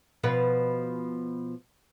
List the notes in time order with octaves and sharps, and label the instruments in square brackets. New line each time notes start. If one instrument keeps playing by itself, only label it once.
[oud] B2 F3 B4